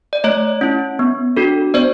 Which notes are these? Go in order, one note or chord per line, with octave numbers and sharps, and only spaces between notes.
D5
A3 C#5 D#5
C#4 E4
B3
D4 F#4 A4
B3 C5 D5